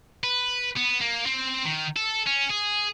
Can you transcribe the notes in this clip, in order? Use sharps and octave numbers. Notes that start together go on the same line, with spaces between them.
B4
B3
A#3
C4
D#3
A4
C#4
G#4